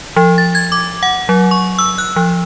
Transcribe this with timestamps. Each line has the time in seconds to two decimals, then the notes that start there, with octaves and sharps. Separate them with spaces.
0.16 F3
0.38 A6
0.55 G#6
0.72 D6
1.03 F#5
1.29 F#3
1.51 C#6
1.79 E6
1.98 F#6
2.16 F3